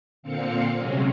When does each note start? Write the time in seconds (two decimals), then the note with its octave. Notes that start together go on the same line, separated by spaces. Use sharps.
0.23 A#2 D3 C4 F5 C#7
0.78 C3 F#3 G#3 C4 C#4